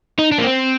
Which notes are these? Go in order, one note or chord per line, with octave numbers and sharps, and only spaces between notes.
D#4
D4
A#3
C4